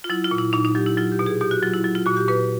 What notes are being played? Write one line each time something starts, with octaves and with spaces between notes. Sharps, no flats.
F4
F#3 E4
F4
A#2
E4
A#2 D#4
D#4
F#3 G4
E4
F#3 F4
G4
B2
G#4
B2 G4
F#4
F#3 F4
E4
F#3
F4
A#2 F#4
G4
A#2 B4